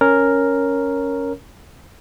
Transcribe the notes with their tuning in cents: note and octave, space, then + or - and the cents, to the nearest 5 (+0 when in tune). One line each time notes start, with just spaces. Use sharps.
C#4 +0 A#4 +0 C#5 +0